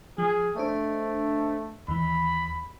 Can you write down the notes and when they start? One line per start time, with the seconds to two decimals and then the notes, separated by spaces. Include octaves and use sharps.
0.18 F3 G#4
0.57 A3 D4 C5 D#5
1.88 D#2 D#3 E3 B5